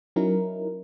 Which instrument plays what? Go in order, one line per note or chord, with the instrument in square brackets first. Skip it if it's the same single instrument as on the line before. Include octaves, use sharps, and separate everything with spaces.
[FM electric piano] F#3 C#4 D#4 E4 A#4